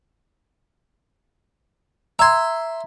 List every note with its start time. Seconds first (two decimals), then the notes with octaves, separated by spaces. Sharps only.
2.19 E5 A#5 C6 G#6